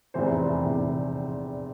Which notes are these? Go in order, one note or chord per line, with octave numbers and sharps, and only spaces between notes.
F1 E2 C3 E3 C5
F1 E2 C3 E3